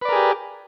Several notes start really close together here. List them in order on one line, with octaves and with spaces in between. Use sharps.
B4 D5 A#4 G#4 G4